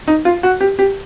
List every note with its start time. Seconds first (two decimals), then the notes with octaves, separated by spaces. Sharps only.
0.08 D#4
0.25 F4
0.43 F#4
0.61 G4
0.79 G4